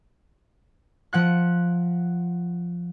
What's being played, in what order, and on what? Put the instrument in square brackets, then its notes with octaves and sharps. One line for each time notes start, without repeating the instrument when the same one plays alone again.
[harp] F3 F#5 F#6